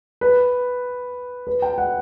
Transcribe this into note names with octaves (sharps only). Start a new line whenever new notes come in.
B4
B4
G5
F#5